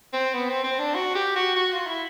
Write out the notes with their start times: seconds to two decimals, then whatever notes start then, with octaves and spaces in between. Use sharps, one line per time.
0.13 C4
0.33 B3
0.49 C4
0.64 C4
0.79 D4
0.94 F#4
1.15 G4
1.35 F#4
1.55 F#4
1.72 F4
1.86 E4